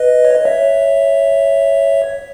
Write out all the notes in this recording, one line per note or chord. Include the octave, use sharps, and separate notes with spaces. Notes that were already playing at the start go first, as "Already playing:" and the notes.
Already playing: B4 D#5
C#5
D#5
C#5 E5